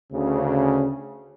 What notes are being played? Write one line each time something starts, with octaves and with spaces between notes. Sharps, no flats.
D2 C#3